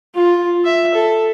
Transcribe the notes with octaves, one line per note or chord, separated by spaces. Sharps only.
F4
E5
A4